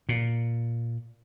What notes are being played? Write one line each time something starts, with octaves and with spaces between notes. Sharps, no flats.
A#2